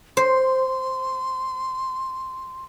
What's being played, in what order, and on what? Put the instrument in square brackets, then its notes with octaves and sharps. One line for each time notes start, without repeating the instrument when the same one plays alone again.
[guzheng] C5 [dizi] C6